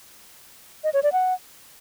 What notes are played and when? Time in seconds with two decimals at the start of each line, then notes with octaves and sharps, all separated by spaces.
0.84 D#5
0.93 C#5
1.03 D5
1.13 F#5